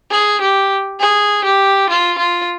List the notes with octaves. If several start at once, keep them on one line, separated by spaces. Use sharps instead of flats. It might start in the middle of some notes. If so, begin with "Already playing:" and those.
G#4
G4
G#4
G4
F4
F4